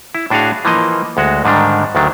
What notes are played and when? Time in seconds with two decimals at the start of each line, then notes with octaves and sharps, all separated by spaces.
0.15 E4
0.30 A2 D4 F#4 G#4 F5
0.65 E3 F3 A#3 D#5
1.17 D2 G#3 F#4
1.45 G#2 D3 D#3 G3 D4
1.95 D2 D#3 F#3 D4